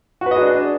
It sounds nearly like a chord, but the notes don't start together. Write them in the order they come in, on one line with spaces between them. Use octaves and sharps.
F#4 B4 D#5 G#4 D4